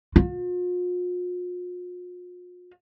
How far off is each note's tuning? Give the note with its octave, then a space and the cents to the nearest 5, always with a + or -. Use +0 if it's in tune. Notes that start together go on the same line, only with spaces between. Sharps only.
F4 +45